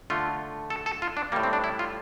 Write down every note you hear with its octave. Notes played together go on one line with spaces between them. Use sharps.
D3 A3 F4
A4
A4
F4
D4
A2 G3 A#3
C4
D4
E4
F4